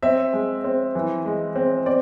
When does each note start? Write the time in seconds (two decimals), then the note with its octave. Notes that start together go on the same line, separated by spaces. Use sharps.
0.03 C4 E5
0.33 G#3
0.64 C4
0.95 E3
1.26 G#3
1.56 C4
1.86 C4 D5